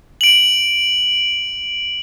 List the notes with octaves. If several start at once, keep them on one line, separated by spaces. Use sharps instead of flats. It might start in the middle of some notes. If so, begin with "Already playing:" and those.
D7 F#7